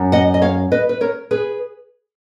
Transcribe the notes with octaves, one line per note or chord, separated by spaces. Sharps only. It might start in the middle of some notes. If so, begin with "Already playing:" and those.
Already playing: F#2
D#5 F#5
D#5
C#5 F5
B4 D#5
B4
A#4 C#5
G#4 B4